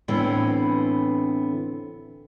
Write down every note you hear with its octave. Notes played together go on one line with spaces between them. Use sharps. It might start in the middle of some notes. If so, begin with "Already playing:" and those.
A2 D3 E3 B3 C4